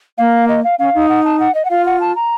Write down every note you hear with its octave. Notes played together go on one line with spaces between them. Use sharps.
A#3 F5
D#5
F5
C#4 F5
D#4
F#5
A5
F#5
D#5
F#5
F4 F5
F#5
A5
A#5